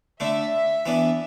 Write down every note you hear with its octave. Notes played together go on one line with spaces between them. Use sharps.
D3 A3 D4 E5
E3 B3 D4